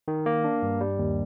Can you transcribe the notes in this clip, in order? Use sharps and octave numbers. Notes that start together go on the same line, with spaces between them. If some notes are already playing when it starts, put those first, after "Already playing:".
D#3
A#3
D4
G2
G3
D#2